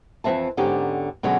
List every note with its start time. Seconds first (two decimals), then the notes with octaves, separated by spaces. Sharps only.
0.24 F2 E3 G#3 C4 E5 A5
0.57 G#2 D3 B3 C#4 D#4 G4
1.23 B2 D3 F#3 C#4 F#4 G#4